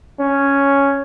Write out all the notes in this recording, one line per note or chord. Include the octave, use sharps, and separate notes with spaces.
C#4